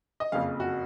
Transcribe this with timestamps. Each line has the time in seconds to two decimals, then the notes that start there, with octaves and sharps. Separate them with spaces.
0.20 D#5
0.32 F#1 F2 C#3 F5
0.60 F#4